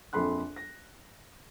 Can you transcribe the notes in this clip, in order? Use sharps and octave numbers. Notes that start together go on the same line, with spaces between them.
A#1 F2 A4 B5 C6 F#6
A#6